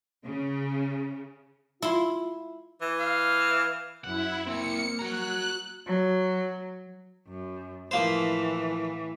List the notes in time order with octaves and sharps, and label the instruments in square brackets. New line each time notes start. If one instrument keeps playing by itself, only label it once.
[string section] C#3
[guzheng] E4 C6 [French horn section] F4
[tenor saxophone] E3
[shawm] F5
[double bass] F#2 [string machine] E4 [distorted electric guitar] F#5
[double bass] A#3 [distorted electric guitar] C4 E4 [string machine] C#7
[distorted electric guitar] F#4 A#5 [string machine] F#6
[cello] F#3
F#2
[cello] A2 E3 [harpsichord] F3 A#3 C5